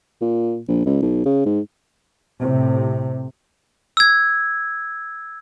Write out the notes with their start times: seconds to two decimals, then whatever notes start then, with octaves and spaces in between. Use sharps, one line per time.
0.21 A#2
0.68 A#1
0.86 C#2
1.02 B1
1.25 C#3
1.46 G#2
2.40 A2 C3
3.97 E6 G#6